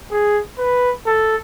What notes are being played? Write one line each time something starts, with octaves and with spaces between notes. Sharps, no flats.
G#4
B4
A4